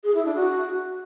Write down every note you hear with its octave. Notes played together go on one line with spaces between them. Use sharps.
G#4
E4
D4
F#4